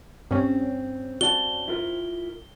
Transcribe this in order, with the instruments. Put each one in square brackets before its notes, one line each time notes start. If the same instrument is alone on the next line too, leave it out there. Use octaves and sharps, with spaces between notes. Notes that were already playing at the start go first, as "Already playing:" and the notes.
[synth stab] G2 C#4 [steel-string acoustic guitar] C4
[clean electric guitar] F#4 D5 A5 [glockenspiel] G7
[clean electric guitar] E4 F4 A#4